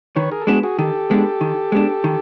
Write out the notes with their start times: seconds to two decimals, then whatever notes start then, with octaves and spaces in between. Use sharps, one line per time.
0.16 D#3 B4 C#5
0.31 G#4 A#4
0.41 A4
0.47 G#3 B3 D4 F#4 G#4
0.63 F#4 G#4
0.78 D#3 G4 A4
1.11 G#3 B3 D4
1.41 D#3
1.72 G#3 B3 D4
2.04 D#3